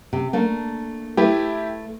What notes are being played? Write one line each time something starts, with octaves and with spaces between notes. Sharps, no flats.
C3
A3 A#3 D4
A3 E4 G4 B4